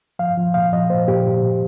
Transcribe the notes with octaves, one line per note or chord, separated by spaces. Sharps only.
F3 F5
F3
A#2 F5
F3 D#5
A#2 C5
A#2 G4
A#2
A#2